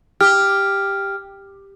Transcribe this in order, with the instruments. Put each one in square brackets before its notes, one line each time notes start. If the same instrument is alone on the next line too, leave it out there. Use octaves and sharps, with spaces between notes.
[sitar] G4 [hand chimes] F6